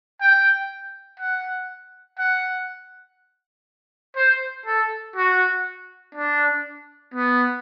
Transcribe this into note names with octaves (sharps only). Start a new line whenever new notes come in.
G5
F#5
F#5
C5
A4
F#4
D4
B3